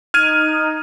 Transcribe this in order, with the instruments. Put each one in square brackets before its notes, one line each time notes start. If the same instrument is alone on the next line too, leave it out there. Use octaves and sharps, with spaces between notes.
[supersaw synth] D#4 [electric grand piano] F6 G#6 D#7